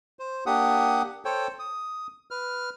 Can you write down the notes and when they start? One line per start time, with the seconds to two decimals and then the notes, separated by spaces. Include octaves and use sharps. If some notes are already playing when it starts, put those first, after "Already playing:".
0.19 C5
0.46 A#3 D4 G4 F#5 D#6
1.25 A4 C5 C#5 G5
1.59 D#6
2.31 B4 F6